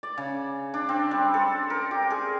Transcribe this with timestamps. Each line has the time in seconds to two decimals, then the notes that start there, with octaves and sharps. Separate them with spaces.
0.03 D5
0.18 C#3
0.74 D4
0.89 C4
1.11 G3
1.34 A4
1.70 A#4
1.91 G4
2.10 G#4